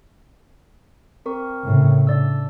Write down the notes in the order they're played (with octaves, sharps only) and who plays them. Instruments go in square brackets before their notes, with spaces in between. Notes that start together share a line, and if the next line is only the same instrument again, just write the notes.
[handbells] C4 A#4 C#6
[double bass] A2 C#3
[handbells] D4 D5 E6